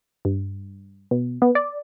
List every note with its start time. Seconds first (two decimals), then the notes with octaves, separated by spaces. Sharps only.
0.25 G2
1.11 B2
1.42 B3
1.55 D5